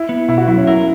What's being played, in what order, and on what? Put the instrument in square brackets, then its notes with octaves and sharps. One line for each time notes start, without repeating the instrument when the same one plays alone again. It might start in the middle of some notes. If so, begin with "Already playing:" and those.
Already playing: [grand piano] E4
[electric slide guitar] B3
[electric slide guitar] B2 [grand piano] E4
[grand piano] F#4
[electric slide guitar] F#3 [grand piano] E4
[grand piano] C#4
[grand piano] E4 [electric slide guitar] A#4